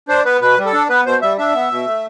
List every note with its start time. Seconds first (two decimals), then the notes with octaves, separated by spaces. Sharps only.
0.08 D4 C5
0.25 B3 B4
0.41 B2 B4
0.58 G3
0.66 A4
0.73 D4
0.89 B3 B4
1.05 B2 C5
1.22 G3 E5
1.38 D4 E5
1.54 B3
1.71 B2
1.87 A3